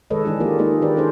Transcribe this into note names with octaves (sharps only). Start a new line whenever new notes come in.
D#3 G#3 A4 B4 C#5 D#5
E3 G#3 D4 G#4
F3 A#3 F4 G4 A#4 D5
G#3 A#3 D#4 G#4 A4
D#3 D4 G4 A#4 B4 D5
C#4 D#4 G#4 A4 C5